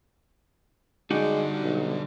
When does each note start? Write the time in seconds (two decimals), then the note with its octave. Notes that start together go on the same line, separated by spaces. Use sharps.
1.11 D3 G3 G#3 D4 D#4 F#4 G4
1.62 B1